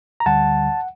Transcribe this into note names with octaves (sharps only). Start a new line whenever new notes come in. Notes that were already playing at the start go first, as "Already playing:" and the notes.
A#5
D2 D3 G3 F#5 A5